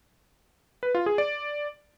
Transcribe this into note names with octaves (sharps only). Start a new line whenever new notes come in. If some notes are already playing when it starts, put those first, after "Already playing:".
B4
F4
G#4
D5